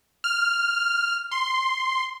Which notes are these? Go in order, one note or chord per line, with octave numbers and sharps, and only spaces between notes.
F6
C6